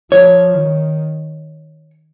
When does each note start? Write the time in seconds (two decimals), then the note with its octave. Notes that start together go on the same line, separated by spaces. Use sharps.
0.12 F3 C#5
0.54 D#3